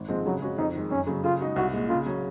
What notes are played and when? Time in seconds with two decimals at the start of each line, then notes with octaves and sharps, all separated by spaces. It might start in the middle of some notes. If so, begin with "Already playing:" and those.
Already playing: G#1
0.09 G#2 F3 G#3 C4
0.26 C#3 F#3
0.41 G#3 C#4 F#4
0.58 F2 D#4
0.75 D#3 G#3
0.91 F#2 C#4
1.07 C#3 F#3
1.24 C#3 F4
1.41 G#3 D#4 F#4
1.56 C2 F#4
1.73 A#2 G#3
1.89 C#3 F4
2.06 F#3 C#4